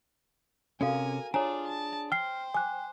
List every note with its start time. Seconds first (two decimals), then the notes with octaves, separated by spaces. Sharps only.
0.81 C3 C#4 F#4 A4 A#4 F5 G#5
1.34 D4 F4 G#4 C#5 D5 G#5 A#5
1.68 A5
2.12 C5 G5 F6 C7
2.54 G#5 D6 F#6